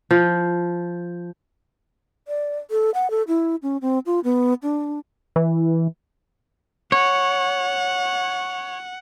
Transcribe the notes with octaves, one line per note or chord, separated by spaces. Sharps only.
F3
D5
A4
F#5
A4
E4
C#4
C4
F4
B3
D4
E3
C#5 F#5